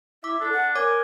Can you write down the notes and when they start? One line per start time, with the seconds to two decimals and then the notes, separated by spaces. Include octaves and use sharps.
0.24 E4 E5 D6
0.40 D4 A4
0.52 F#5
0.75 A#4 C#5 G#5 D6